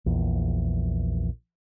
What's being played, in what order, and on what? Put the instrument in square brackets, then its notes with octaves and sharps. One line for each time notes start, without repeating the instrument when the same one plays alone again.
[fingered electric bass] A#1 E2